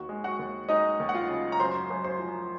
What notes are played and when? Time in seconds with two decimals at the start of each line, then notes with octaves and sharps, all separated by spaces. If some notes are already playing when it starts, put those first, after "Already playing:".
Already playing: D#2 F#4
0.09 G#3
0.24 F#4 F#5
0.39 D#2
0.69 G#3 D#4 D#5
1.00 D#2
1.09 F#5
1.14 F4 F5
1.29 C#3
1.52 A#5
1.59 F#2 C5 C6
1.90 F#2
2.04 C5 C6
2.20 F3